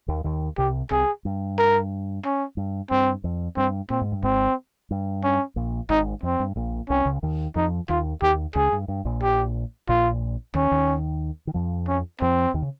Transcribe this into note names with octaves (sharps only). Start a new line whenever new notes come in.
D#2 D#3
D#2 D#3
C2 C3 G4
C2 C3 G#4
G2
A#4
C#4
G2
G2 C4
F2
G2 C4
A#2 C4
G#2
G2
G#1 G#2 C4
G2
C#4
A#1 A#2
G#1 G#2 D#4
F2 C4
G2
A#1 A#2
C2 C3 C#4
C#2 C#3
D#2 D#3
F2 F3 D#4
D#2 D#3 F4
D#2 D#3 G4
C#2 C#3 G#4
G2
G2
A#1 A#2
G4
A#1 A#2 F4
D#2 D#3 C#4
D#2 D#3
D#3
F2 F3
C#4
F2 F3 C4
D#2 D#3
C#3